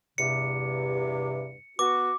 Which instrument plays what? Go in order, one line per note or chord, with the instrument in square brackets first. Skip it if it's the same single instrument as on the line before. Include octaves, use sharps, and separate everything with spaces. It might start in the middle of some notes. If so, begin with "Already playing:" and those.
[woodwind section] E2 G2 C3 [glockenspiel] C#7
[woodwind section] B3 F#4 [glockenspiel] D6